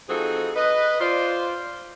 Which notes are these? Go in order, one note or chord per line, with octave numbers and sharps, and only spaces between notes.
F3 C4 D#4 F#4 G#4 A4
B4 D#5
F4 C5 D5